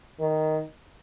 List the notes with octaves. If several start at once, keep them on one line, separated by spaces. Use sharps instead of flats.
D#3